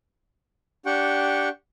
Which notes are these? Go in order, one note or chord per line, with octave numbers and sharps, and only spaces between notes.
D4 G4 F#5 G5 C#6